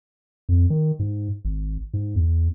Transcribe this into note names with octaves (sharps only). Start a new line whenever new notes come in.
F2
D#3
G#2
G#1
G#2
E2